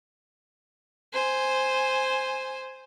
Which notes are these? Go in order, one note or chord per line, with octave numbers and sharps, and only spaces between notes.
C5 G#5